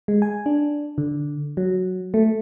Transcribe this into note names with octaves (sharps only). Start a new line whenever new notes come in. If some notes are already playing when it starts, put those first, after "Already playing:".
G#3
G#5
D4
D3
F#3
A3